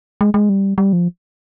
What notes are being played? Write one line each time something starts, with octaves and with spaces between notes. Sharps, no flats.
G#3
G#3
G3
G3
F3